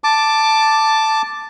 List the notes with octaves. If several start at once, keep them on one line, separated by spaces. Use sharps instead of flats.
A5 D6